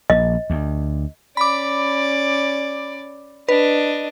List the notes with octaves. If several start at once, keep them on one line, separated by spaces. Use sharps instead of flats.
A#1 D#5
D2
C#4 D5 B5 D6
D4 B4 D#5